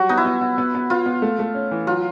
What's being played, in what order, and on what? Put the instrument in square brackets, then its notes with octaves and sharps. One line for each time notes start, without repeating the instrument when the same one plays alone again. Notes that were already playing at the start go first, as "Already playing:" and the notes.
Already playing: [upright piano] F#3 G3 [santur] F#4
[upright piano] B3 [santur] D#4
[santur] E4
[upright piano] B3
B3
B3
B3
[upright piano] B3 [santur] F4
[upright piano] B3
A3
A3
C#4
E3
[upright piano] F#3 [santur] F4